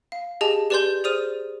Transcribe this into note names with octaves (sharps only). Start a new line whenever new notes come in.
F5
G4 G#4 D#5 G#5 A5
G4 B4 D5 G#5 C6 G6
G#4 C5 D5 D#6 F6 D#7